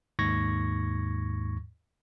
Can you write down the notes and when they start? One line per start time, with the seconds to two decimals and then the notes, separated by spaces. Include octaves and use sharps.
0.19 D#2 G#2 C#6 G#6 A#6